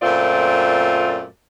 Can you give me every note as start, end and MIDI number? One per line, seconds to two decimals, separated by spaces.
0.02 1.25 42
0.02 1.25 46
0.02 1.25 57
0.02 1.25 60
0.02 1.25 65
0.02 1.25 74